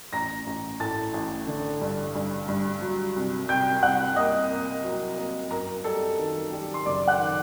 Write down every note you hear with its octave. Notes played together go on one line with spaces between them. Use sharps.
A1 A#5 A#6
A1
A2 A5 A6
A1
D3
G2
G2
G2
F#3
C2
C2 G5 G6
C2 F#5 F#6
A#3 D#5 D#6
A#3
F#3
A#3
F#2 A#4 A#5
G3 A4 A5
D#3
G3
C6
F#1 D5 D6
F#5 F#6
D#3